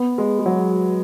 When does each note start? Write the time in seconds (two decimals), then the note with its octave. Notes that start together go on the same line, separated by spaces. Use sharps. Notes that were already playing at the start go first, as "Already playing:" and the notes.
Already playing: B3
0.18 G#3
0.39 G#3
0.46 F#3